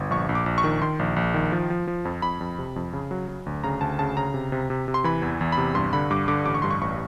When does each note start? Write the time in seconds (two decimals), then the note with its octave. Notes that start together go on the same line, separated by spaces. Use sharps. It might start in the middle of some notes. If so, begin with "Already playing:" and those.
Already playing: G1
0.11 A#1 C#6
0.29 A#1
0.35 D6
0.46 A#1
0.58 C#6
0.64 D#3
0.82 D#3 C6
0.99 A#1
1.16 A#1
1.34 D#3
1.52 F3
1.70 F3
1.87 F3
2.05 F2
2.22 F2 B5
2.41 F2
2.59 C3
2.76 F2
2.93 C#3
3.11 F#3
3.28 F#3
3.46 D2
3.64 C#3 A#5
3.81 D2 A5
3.99 C#3 A5
4.17 C#3 A#5
4.34 C3
4.52 C3
4.70 C3
4.88 C3
4.94 C6
5.04 E3 B5
5.22 E2
5.41 E2
5.52 B5
5.58 C3
5.75 G2 C6
5.93 D3 B5
6.10 G2 D6
6.28 D3 D6
6.45 A1 D6
6.54 C#6
6.62 G2 C6
6.71 C#6
6.81 A1 C#6